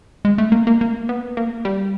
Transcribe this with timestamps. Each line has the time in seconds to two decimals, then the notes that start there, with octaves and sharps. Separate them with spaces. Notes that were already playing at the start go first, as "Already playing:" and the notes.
0.25 G#3
0.38 A3
0.52 A#3
0.67 A#3
0.81 A#3
1.09 B3
1.37 A#3
1.65 G3